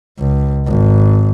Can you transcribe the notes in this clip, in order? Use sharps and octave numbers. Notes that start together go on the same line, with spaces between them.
C#2
G#1